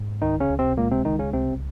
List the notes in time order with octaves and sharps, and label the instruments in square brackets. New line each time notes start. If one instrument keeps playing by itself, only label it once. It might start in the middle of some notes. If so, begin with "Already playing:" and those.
Already playing: [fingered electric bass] G#2
[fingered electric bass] C#2 [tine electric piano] D#3 D#4
[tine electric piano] C#3 C#4
[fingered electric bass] C#2
[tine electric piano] C3 C4
[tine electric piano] A#2 A#3 [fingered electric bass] G#3
[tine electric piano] C3 C4
[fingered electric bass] C#2 [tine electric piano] D#3 D#4
[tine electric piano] C#3 C#4
[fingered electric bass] C2 [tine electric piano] C3 C4